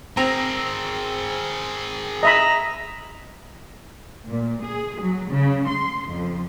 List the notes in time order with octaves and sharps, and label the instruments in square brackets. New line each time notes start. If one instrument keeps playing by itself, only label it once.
[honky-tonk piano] C4 [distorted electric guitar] G#4 A#4 [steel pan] A#5
[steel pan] D#5 E5 B5 [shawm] A#5
[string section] A#2
G#4
F#3
C#3
C6
F2